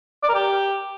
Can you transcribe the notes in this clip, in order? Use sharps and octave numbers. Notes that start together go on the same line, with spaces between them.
D5
A#4
G4